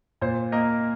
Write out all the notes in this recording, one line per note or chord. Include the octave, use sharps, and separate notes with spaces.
A#2 C5
A#3 A#4 D#5